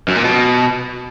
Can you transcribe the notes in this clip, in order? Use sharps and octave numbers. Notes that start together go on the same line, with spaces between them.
F#2
A#2
B2